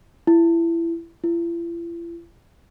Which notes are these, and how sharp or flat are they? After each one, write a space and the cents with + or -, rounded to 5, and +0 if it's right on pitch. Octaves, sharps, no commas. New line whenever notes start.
E4 +25
E4 +45